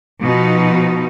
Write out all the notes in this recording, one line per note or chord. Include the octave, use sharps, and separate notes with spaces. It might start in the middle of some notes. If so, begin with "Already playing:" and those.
B2 F3 D#4